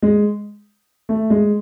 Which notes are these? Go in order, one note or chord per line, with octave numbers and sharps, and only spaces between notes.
G#3
A3
G#3